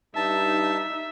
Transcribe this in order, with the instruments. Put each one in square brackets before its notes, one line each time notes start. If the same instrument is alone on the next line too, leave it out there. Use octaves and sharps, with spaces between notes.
[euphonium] G2 [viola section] D#4 [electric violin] E5 [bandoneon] A5